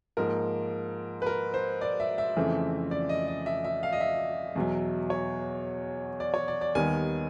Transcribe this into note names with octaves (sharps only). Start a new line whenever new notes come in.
G#2 F3 A#3 A#4
B4
A#4
C5
D5
E5
E5
F2 C#3 E3 A3 C4
D5
D#5
D#5
E5
E5
F5
D#5
E5
E2 B2 F#3
C#5
D5
C#5
D5
D5
D#2 D#3 G3 B3 G#5